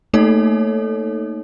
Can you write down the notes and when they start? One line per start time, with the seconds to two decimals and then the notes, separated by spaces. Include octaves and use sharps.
0.14 A3 A#3 D#4 A4 C#5